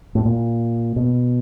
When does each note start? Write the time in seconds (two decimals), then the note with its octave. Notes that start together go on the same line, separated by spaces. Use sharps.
0.15 A2
0.25 A#2
0.96 B2